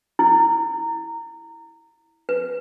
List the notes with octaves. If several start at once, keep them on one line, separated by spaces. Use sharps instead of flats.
E4
B4